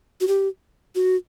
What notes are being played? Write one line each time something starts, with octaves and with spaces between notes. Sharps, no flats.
F#4
G4
F#4